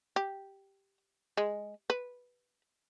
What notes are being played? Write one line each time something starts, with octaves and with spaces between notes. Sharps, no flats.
G4
G#3
B4